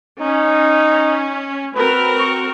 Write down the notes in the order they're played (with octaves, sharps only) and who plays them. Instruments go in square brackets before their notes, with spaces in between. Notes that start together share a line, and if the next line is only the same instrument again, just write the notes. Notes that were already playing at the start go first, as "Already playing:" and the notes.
[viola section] C#4 [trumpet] D#4
[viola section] C4 F#4 A#4 [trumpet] B4
[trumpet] C#6